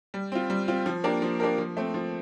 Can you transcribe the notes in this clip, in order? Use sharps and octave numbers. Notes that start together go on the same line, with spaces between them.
G3
C4 F4
G3
C4 F4
F3
A#3 D4 G4 A#4
F3
A#3 D4 G4 A#4
F3
A3 C4
F3